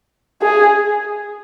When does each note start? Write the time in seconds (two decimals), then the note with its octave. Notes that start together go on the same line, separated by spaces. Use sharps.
0.42 G#4